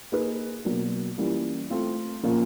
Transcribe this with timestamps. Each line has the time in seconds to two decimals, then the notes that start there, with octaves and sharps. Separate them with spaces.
0.12 A#3 D#4 G#4 B4
0.65 B2 F#3 A#3 D4
1.17 E3 G3 A#3 C#4 F4
1.70 A3 C4 F4
2.23 A#2 F3 A#3 C#4 F4